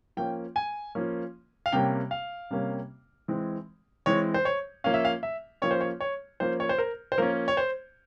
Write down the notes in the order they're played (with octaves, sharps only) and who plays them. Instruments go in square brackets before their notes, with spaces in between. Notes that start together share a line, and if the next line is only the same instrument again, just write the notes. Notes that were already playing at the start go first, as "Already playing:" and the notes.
[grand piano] F3 A#3 C#4 G5
G#5
F3 A#3 C#4
F5
C3 G3 A#3 C#4 G5
F5
C3 G3 A#3 C#4
E3 G#3 C4
E3 G#3 C4 C#5
C5
C#5
F3 A#3 C#4 F5
E5
F5
E5
F3 A#3 C#4 C#5
C5
C#5
C#5
F3 A#3 C#4 C5
C#5
C5
A#4
C5
F3 A#3 C#4 A#4
C#5
C5